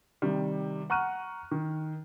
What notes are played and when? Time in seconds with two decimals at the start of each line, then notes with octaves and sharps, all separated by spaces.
0.22 C3 D#3 G3
0.90 F#5 A#5 C#6 F6 F#6 D#7
1.51 D#3